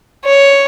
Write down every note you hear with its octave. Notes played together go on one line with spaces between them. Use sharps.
C#5